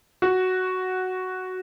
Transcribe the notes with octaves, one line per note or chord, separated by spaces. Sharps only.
F#4